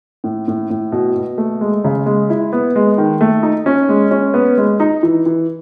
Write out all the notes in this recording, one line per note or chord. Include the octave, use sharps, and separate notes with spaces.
A2
A2
A2
B2
B2
A3
G#3
C#3
G#3
E4
B3
G#3
D#3
A3
D#4
C#4
G#3
C#4
B3
G#3
D#4
E3
E3